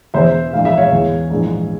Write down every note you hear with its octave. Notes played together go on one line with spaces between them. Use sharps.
E1 E2 E3 C5 E5
A#1 G#2 E3 F5
E5
C#5 F5
E2 E3
A#1 G#2 E3